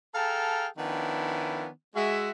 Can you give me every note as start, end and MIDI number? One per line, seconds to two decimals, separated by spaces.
0.15 0.67 68
0.15 0.67 69
0.15 0.67 77
0.15 0.67 79
0.15 0.67 81
0.15 0.67 82
0.78 1.68 51
0.78 1.68 53
0.78 1.68 59
0.78 1.68 61
0.78 1.68 62
0.78 1.68 64
1.95 2.31 56
1.95 2.31 66
1.95 2.31 76